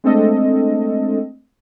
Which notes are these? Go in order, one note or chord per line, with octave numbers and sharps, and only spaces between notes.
G#3 A3 C4 D4 A4 D#5